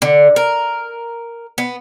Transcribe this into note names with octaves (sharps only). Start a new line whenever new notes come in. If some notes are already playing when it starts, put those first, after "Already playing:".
D3
A#4
B3